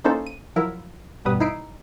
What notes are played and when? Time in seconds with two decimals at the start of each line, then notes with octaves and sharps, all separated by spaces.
0.04 A#3 C#4 D#4 E4 A4 C5
0.27 D#7
0.56 F3 F#3 E4 A#4
1.25 A1 G2 B2 G3 B4 D#6
1.40 D#4 E4 C7 D7